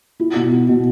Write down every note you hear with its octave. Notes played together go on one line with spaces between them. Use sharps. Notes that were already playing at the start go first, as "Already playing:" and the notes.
E4
B2
E4
B2